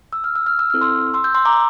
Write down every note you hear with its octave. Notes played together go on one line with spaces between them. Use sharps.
E6
F6
E6
F6
E6
C4 E4 A4 F6
C6 E6
C6 E6
E6 G6
C6 E6
A#5 D6